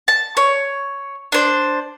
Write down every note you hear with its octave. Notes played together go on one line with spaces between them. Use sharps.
A5
C#5
D4 C5